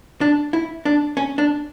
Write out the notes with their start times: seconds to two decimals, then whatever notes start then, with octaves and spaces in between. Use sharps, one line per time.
0.21 D4
0.53 E4
0.85 D4
1.17 C#4
1.38 D4